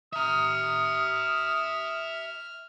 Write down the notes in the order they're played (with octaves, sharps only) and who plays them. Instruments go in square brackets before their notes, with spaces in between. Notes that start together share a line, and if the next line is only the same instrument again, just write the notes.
[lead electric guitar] E5 A#5 [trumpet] D#6 [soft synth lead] F6